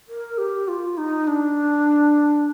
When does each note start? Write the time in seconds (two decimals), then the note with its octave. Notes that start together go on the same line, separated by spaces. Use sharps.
0.08 A#4
0.38 G4
0.68 F4
0.98 D#4
1.27 D4